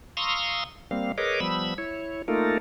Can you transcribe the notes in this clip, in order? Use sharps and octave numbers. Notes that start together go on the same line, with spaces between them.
F5 A#5 C6 C#6 D#6 E6
G3 A#3 C4 F5
G#4 A#4 B4 C#5 D#5 D6
F3 G3 B3 B5 E6
E4 C#5
A3 A#3 D#4 F4 A4 A#4